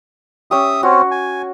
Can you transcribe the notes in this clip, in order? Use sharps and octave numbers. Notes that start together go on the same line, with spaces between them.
C#4 G4 E5 D#6
C4 C#4 F#4
G#5